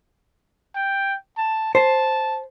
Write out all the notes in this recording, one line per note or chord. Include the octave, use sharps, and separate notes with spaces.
G5
A5
C5 A5